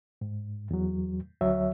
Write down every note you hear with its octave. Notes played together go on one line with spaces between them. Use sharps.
G#2
E2 F#3
D2 F#3 C#5 E5